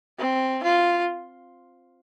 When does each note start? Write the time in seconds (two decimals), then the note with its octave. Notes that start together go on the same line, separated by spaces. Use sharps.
0.19 C4
0.63 F4